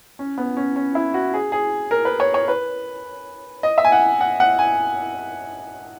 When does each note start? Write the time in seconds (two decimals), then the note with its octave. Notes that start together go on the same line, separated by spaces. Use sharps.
0.19 C#4
0.38 B3
0.57 C#4
0.76 C#4
0.95 E4
1.14 F#4
1.34 G#4
1.52 G#4
1.91 A#4
2.05 B4
2.20 C#5
2.34 C#5
2.48 B4
3.63 D#5
3.78 E5
3.85 G#5
3.92 F#5
4.21 F#5
4.40 F#5
4.59 G#5